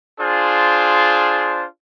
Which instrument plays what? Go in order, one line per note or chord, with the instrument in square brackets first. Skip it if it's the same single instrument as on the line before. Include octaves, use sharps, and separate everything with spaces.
[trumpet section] D4 F4 G#4 C5